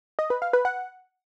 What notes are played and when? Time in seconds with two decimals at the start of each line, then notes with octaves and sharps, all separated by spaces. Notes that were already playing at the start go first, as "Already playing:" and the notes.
0.19 D#5
0.30 B4
0.42 F5
0.53 B4
0.65 F#5